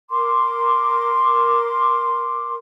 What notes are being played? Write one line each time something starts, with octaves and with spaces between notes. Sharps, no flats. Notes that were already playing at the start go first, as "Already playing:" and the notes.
A#4 C6 D6